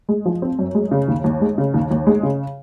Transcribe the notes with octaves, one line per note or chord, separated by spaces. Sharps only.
G#3
F3
C4
F#2
G#3
C#3
D#2
D#2
G#3
C#3
D#2
D#2
G#3
C#3